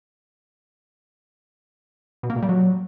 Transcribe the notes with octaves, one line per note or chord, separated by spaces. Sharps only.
B2
A#3
A#2
G3
F#3